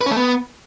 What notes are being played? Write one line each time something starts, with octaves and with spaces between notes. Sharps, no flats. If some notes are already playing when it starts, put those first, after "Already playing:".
B4
C#4
A3
B3